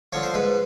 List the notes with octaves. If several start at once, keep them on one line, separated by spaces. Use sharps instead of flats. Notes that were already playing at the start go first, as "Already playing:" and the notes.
D3 F3 C#5
C5
G#2 B4